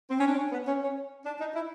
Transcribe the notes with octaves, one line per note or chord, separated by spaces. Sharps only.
C4
C#4
D4
C#4
B3
C#4
C#4
D4
D#4
E4